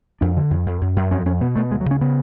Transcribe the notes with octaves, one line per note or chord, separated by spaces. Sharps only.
F2 D4
D3
F2
F2
F#2
F#2
F2 C#4
F2 C#4
B2 B3
B2 A3
D2 G#3
F#3
C#3
C#4
C#3 B3